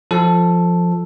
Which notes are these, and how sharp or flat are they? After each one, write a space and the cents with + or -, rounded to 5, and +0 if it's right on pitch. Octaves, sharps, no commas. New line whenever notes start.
F3 +0 A4 +0